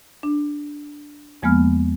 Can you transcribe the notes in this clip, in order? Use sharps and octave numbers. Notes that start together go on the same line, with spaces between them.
D4
E2 F3 G#3 A#3 B3 F6